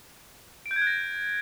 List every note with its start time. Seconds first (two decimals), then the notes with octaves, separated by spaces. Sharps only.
0.66 D7
0.71 G6
0.76 G#6
0.82 F#6
0.87 A#6